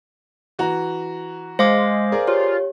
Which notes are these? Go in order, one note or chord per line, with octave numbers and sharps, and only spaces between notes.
E3 F#4 A#5
G#3 C5 F5 D6 A#6
G#4 A#4 D5
F4 G4 C#5